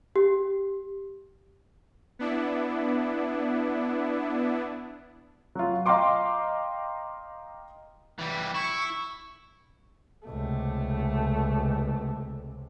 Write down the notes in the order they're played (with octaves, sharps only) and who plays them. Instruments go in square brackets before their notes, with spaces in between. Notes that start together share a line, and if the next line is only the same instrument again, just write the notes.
[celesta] G4
[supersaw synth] B3 D4 E4
[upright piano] F#3 F4
D#5 F5 G5 A#5 C6 D6
[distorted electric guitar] E3 G3
[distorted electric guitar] E4 [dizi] C#6
[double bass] C#2 C3 [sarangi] A3